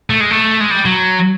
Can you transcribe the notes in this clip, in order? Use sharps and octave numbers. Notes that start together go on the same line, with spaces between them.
A3
G#3
A3
G#3
G3
F#3